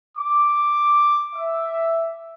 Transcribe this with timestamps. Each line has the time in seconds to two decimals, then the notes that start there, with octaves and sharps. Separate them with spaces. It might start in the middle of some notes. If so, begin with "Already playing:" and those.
0.18 D6
1.34 E5